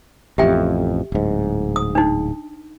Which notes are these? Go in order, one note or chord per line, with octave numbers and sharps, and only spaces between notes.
A1 F2 G4 E5 G5
D1 G#2
D#6
D4 D#4